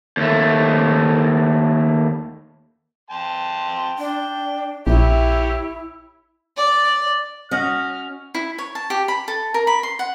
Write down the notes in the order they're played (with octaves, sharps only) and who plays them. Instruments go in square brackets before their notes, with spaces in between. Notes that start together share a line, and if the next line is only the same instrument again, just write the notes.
[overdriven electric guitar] D#2 A3
[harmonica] G5 A5 C6
[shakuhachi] D4 [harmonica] G5
[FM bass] A#1 [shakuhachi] E4 [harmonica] G4 C#5 E5
[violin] D5
[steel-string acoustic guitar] C#4 [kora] F#4 D#5 F#5 [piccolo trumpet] F6
[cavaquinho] E4
C#5
A5
G4
B5
A4
A#4
B5
C6
F#5